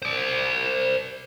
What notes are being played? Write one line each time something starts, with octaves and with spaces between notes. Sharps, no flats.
C5 D5